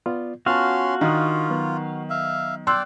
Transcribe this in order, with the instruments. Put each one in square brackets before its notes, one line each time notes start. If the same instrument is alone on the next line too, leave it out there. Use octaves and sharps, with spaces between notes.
[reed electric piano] B3 F4 D5
[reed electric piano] B3 F4 A5 [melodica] C#4 C6 [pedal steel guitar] F#4 F5
[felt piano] D#3 [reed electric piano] D4 D#6 [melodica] F4
[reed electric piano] F#3 B3
[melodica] E5 F5
[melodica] D5 G5 [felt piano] C6 E6 F#6